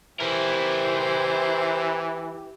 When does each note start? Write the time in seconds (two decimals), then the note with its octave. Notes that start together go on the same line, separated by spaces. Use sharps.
0.20 E3 E4 G4 A#4 C5